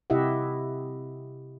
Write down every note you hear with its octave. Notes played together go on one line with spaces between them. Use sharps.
C3 E4 G4 D#5 E5 F#5